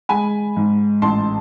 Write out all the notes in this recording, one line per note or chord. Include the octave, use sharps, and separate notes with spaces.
G#3 G#5 B5
G#2
A1 A5 C6